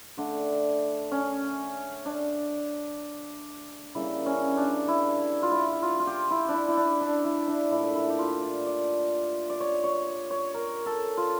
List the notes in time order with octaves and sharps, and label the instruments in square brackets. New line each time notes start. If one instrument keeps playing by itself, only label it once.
[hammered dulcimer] D3 A3 D4
C#4
D4
C#3 G3 A#3 E4
C#4
D4
E4
F4
E4
F4
F4
G4
E4
D4
E4
E4
D4
D4
E4
D4
A#2 A3 E4
E4
G4
F4
D5
D5
D5
C#5
C#5
C#5
A#4
A4
F4